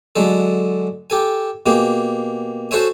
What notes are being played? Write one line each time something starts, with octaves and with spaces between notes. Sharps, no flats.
D3 F#3 G#3 A4
G4 A4 G#5
B2 A#3 G4 G#4
F#4 A4 C5 C#5 E5 G#5